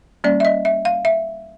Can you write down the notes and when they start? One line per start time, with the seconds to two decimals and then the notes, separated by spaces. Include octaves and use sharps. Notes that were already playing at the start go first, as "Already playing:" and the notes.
0.24 G3 A#3 C#4 D5
0.40 E5
0.45 D#5
0.65 E5
0.85 F5
1.05 E5